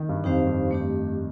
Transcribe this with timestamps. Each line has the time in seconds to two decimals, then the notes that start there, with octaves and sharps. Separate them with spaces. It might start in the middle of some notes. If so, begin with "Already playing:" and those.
Already playing: D#3
0.09 G2
0.24 F2 D#4 G4 C5 F5
0.47 G2
0.71 A3 D4 G4